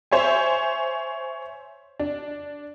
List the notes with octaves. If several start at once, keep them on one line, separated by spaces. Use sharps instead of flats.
C5 C#5 E5 G#5
D4